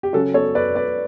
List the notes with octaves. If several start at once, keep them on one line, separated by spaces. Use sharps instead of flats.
G4
C#3 F#3 C#4 F#4 A4
A4 C#5
B4 D5
B4 D5